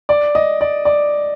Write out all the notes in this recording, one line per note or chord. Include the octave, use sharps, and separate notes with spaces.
D5
D#5
D5
D5